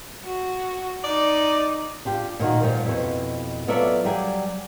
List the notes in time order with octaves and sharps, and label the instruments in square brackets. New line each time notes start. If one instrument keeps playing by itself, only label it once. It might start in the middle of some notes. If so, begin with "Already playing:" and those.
[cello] F#4
[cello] D#4 [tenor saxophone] D5
[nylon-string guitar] D4 F4 G4
A#2 D#3 F4 F#4
A#2 F3 G3
F2 G#2 B2 E4
F#3 B3 F4 A4 D5 E5
F#3 G3 D5 G#5